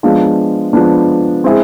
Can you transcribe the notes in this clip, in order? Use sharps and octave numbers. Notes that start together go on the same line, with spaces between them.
F3 G#3 B3 D4 F4
F3 G#3 B3 D4 F4
G#3 C4 E4 G#4